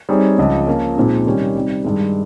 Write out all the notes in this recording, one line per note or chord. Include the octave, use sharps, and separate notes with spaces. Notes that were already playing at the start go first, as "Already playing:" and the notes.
G3 C4 D#4 G#4 C#5
C#2 C#3 F3
F3 A#3 C#4
A#2 F3 G#3 C4 D#4
C3 D#3 G3 C#4 G4
C3 G3 C4 D#4
G2 D#3 G#3